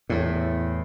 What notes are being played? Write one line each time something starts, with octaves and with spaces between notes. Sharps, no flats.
E2 A2